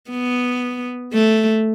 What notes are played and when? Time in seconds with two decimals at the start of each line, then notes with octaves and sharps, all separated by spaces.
0.11 B3
1.13 A3